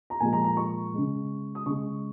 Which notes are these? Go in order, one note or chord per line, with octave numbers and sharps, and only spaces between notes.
A#5
A#2 F3 G#3 G#5
A#5
A#5
C#6
C#3 G#3
D#6
C#3 G#3 C#6